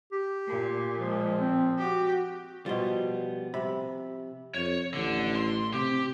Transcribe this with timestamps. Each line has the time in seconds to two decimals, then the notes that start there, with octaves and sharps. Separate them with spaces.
0.12 G4
0.47 A#2
0.98 F3 G#3
1.40 C4
1.78 F#4 G4
2.66 B2 F3 G3 B3 C6
3.54 C3 B5
4.54 F2 C#5
4.94 A1 D3
5.36 C6
5.74 C3 G4